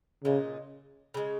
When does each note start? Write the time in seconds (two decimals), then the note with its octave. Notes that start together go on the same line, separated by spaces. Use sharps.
0.24 A#2 C#3 G#3 D#4
1.14 C#3 F3 G#3